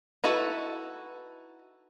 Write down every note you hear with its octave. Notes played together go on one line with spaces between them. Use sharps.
D#4 E4 F#4 A4 B4